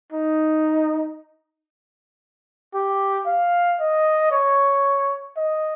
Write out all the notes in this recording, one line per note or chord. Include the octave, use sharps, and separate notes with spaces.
D#4
G4
F5
D#5
C#5
D#5